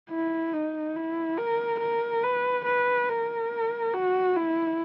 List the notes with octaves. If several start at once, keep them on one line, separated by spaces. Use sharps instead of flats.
E4
D#4
E4
A#4
A#4
B4
B4
A#4
F#4
E4